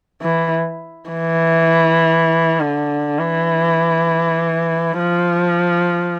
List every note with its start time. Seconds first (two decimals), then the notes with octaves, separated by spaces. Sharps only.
0.22 E3
1.11 E3
2.61 D3
3.20 E3
4.99 F3